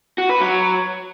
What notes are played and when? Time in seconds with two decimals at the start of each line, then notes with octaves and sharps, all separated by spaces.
0.18 F#4
0.29 B4
0.41 F#3